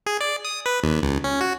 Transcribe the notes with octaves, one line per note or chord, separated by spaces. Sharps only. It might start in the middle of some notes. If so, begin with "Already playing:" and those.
G#4
D5
D#6
B4
D#2
C#2
C#4
F#4